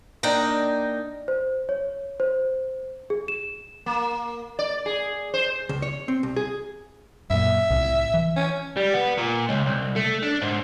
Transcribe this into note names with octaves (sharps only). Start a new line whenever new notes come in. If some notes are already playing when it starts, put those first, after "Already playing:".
A#3 D4 D#4 G5 A#5
C5
C#5
C5
G#4
E7
A#3
D5
G#4
C5
C#2
C#5
C4
C2
G#4
F#2 A#2 E5
C2 A2 C3
E3
C#4
G3
B3
A#2
C#2
C2
A3
D4
G#2